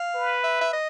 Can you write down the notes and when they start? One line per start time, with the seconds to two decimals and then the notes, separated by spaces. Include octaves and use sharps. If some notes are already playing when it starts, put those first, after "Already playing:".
Already playing: F5
0.15 B4
0.44 E5
0.61 E5
0.73 D#5